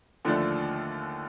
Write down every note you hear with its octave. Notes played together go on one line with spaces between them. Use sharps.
D#2 D3 F3 A3 D4